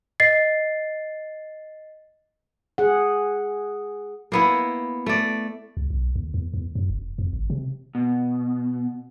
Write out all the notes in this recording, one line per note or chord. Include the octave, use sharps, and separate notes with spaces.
D#5 A6 C7
G#4 F#5
A#3 B3 E4
A3 D5
C#2
B1
D#2
E2
E2
F#2
F1
F2
G#1
C3
B2